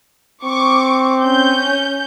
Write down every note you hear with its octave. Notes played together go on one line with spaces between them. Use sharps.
C4 C#6 D6
C#4 G6